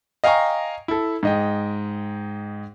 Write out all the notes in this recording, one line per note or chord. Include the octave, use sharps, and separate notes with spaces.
D#5 F5 G5 G#5 A#5 C#6
E4 A4
G#2 D#5 G5